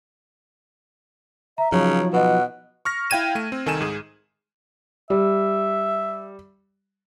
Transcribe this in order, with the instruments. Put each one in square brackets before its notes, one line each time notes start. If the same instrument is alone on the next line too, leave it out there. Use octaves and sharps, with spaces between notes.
[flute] E5 [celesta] A#5
[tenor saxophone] C#3 [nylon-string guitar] F3 F#3 D#4 [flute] C#5
[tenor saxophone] B2 [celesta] B4 D#5 [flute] F#5
[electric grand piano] C#6 F6 A#6
E4 F5 G5 G#6 D#7 E7
A3 D#7
C4
C2 D#3 A4 G#5 D#7 E7
G#2 G#4
[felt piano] G3 [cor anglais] E5